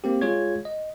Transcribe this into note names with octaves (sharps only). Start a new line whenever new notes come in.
A#3 C4 G4
G#3 F4 G#4 C#5 G#6
D#5